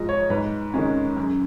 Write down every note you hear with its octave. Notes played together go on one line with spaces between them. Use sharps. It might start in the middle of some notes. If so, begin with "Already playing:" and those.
Already playing: G#2 F3 G#3 D#5
C#5
G#2 B4
D#3 G#3 C#4
F#2